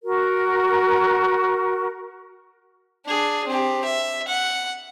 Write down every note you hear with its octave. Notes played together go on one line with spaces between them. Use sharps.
F#4 A#4
D4 G#4
C4 G4
E5
F#5